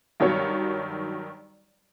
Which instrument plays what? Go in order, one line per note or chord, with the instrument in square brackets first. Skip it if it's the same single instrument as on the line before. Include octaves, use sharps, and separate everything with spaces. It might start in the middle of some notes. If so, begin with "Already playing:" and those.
[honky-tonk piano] G2 D#3 F#3 C#5